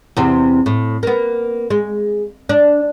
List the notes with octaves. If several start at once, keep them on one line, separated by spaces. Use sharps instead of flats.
E2 C3 C4
A2
A#3 B3
G#3
D4